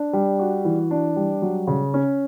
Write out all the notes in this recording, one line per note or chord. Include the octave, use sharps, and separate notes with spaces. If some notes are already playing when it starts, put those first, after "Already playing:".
Already playing: D4
G3
F#4
E3
D4
G3
F#3
C#3
C#4